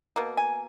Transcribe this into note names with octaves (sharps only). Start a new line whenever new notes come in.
B2 A#3
G#5